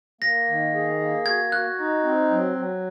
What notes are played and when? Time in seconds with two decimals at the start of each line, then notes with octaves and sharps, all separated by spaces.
0.21 A#3 A#6
0.47 D#3
0.74 G#4
1.00 A#3
1.26 F#4 G#6
1.52 F#4 F#6
1.78 D#4
2.04 C4
2.30 F#3
2.55 F#3